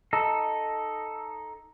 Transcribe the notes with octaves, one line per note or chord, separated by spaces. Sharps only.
D#4 A4